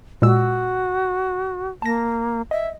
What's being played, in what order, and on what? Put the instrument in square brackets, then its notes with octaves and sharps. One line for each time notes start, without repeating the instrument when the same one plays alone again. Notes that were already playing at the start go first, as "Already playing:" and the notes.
[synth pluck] A#2 G#3 E6 [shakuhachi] F#4
[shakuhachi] A#3 [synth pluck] A5 A#6
[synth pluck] D#5 [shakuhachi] E5